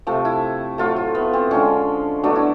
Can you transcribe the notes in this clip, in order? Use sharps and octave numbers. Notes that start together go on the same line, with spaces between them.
C3 F3 A3
E4
A2 F#3 A3 F4
F4
B3
C4
D3 F3 G#3 C#4
B2 F#3 A3 D4
E4